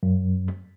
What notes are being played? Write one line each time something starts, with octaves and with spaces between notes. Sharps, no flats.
F#2